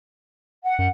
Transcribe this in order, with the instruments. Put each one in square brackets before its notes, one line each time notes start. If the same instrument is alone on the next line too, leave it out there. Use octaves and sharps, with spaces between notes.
[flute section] F#5
[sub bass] F#2